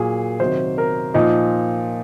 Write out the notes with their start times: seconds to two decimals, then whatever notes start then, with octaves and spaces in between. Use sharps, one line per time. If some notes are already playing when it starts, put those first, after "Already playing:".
Already playing: A#2 F#3 G#4
0.40 C3 D#3 F#3 C5
0.78 A#4
1.14 A#2 F3 D#4